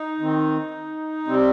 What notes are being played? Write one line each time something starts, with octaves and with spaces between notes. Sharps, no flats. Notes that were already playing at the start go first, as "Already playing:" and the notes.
Already playing: D#4
D#3 C4
C3 G3 C4